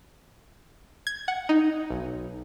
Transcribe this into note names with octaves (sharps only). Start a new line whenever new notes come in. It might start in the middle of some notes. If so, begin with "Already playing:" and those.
G#6
F#5
D#4
B1